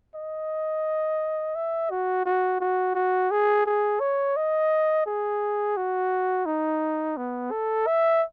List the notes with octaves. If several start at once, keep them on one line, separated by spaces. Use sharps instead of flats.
D#5
E5
F#4
F#4
F#4
F#4
G#4
G#4
C#5
D#5
G#4
F#4
D#4
B3
A4
E5